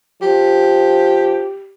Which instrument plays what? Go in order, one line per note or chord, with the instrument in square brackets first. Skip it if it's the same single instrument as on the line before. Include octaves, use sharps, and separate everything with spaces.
[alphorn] F3 [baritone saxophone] G4